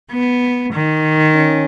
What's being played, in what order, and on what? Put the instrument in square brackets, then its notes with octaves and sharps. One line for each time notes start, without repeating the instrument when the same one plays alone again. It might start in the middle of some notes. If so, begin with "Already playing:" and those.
[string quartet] B3
D#3
[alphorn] C#4